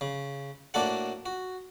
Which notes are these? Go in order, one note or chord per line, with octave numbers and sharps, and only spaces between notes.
C#3
A2 A#3 D4 F#4 A4 F#5
F#4